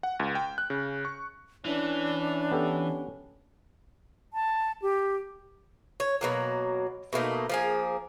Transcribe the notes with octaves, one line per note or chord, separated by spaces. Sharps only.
F#5
C#2
G5
F#6
C#3
C#6
E3 C#4 D4
B3 G4 A4
A5
G4
C#5
B2 F#3 A#3
B2 A3 A#3 D#4
F3 A#3 G#4